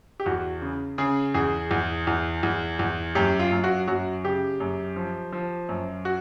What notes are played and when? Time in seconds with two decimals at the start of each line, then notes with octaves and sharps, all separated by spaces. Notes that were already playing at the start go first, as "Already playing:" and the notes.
0.20 G4
0.26 E2 F#4
0.62 C#3
0.98 C#3 G#4
1.34 E2 G#4
1.71 E2
2.07 E2
2.43 E2
2.79 E2
3.15 F#2 G4
3.39 F4
3.52 F#2
3.64 F#4
3.88 F#2 F#4
4.24 C#3 G4
4.60 F#2
4.96 F3
5.33 F3
5.69 F#2
6.05 F#4